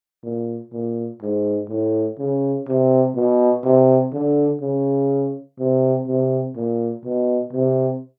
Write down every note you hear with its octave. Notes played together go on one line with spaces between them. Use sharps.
A#2
A#2
G#2
A2
C#3
C3
B2
C3
D3
C#3
C3
C3
A#2
B2
C3